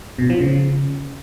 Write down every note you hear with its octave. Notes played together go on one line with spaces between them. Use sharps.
B2
F3
C#3